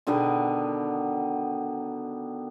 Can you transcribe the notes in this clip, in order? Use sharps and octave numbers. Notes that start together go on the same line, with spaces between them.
B2 D3 D#3 B3